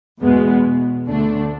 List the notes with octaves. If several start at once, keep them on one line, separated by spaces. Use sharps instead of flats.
E2 B2 G#3 B3
D2 D3 A3 D4